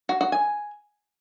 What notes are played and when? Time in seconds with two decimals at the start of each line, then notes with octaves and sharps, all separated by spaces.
0.09 F#4
0.21 F#4
0.32 G#5